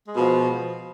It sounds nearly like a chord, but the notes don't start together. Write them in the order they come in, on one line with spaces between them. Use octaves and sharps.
G#3 B2 F3